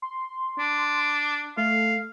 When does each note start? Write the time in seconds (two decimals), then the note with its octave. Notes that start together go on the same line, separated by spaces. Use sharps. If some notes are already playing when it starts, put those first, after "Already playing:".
0.02 C6
0.58 D4
1.57 A3 F5